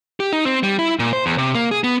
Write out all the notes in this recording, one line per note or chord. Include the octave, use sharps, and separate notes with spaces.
G4
D#4
C4
G3
E4
A#2
C5
E2
C3
A#3
G#4
B3